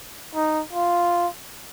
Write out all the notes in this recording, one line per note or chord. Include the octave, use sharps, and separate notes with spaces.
D#4
F4